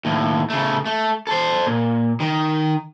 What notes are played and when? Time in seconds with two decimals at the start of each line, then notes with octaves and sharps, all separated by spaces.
0.05 D#2 A2
0.50 C#3 A3
0.86 A3
1.27 A4 C5
1.66 A#2
2.20 D#3